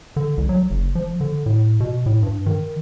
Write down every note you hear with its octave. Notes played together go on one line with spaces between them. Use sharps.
D3
C2
F#3
F#1
F3
D3
A2
B2
A2
G2
D#3